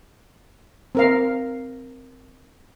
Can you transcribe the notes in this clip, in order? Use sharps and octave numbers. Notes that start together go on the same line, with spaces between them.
C4 A#4 F5